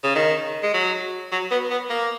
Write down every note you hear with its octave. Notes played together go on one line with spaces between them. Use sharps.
C#3
D#3
G#3
F#3
F#3
B3
B3
A#3